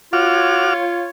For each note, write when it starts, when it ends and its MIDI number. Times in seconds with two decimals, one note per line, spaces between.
0.13 1.09 65
0.13 0.74 66
0.13 1.09 73
0.13 0.74 86
0.13 0.74 89